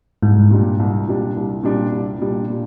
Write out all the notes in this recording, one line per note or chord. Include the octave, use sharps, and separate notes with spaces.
C2 G#2
A#2 G3 D4
C2
A#2 G3 D4
C2
A#2 G3 D4
C2
A#2 G3 D4
A#2